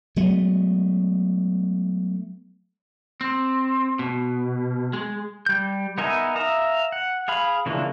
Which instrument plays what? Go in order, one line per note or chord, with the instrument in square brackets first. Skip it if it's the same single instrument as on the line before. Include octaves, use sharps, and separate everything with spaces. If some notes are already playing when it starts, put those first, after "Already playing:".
[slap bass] F#3 G#3 A3 B3
[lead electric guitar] C4
B2
G#3
[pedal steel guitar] G3 G6
B3 D#4 A#4 E5 G#5
E5 F5 A#5 D#6
F#5
G#4 F5 B5
C#3 E3 F3 A#3 D4